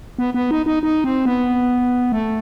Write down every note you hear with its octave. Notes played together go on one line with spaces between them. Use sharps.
B3
B3
D#4
D#4
D#4
C4
B3
A3